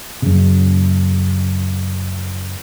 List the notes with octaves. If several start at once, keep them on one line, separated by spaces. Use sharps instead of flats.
F#2 C#3